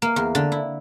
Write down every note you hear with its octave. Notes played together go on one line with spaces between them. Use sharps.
A#3
E2
D3
E4